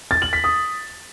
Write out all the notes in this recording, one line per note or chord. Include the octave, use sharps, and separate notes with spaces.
A6
F#7
B6
D#6